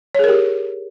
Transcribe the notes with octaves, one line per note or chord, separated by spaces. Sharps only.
G4 G#4 A#4 C#5